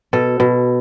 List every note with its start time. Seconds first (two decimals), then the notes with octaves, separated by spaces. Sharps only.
0.13 B2 A4
0.40 B2